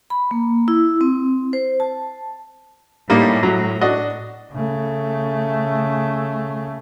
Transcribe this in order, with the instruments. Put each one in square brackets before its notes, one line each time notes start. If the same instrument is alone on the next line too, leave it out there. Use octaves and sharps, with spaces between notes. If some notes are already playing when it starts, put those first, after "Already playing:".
[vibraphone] B5
A#3
E4
C4
C5
A5
[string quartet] A2 [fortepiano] G3 A#3 D#4
[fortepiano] F#3
D4 F#4 D#5
[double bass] C#3 A3